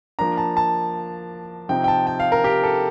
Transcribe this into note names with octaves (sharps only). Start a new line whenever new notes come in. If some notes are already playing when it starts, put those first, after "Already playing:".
F3 A#3 D4 A#5
A5
A5
C3 F3 C4 D#4 G5
G5
A5
G5
F5
A#4
G4
A4